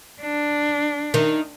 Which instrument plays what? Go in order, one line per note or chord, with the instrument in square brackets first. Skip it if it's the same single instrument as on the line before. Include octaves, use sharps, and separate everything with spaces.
[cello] D4
[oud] D#3